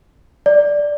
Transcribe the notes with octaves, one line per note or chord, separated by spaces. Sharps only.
D5